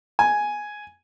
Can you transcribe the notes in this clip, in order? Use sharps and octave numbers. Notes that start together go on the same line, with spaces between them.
G#5